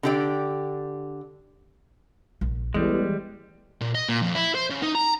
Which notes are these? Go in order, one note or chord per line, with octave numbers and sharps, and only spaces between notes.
D3 G4 D5
A#1
A1 E2 E3 G3 G#3
A#2
D#5
A#2
F2
E4
C5
C#3
D#4
A#5